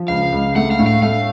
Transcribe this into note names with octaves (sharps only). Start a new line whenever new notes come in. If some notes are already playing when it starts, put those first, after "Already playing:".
Already playing: F3
C#2 F5
C#2
A3 F#5
F5
A2
F5
A3 F5